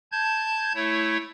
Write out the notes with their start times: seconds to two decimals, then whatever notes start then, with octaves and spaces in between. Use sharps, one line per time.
0.12 A5 G6 G#6
0.75 A3 E4 C#5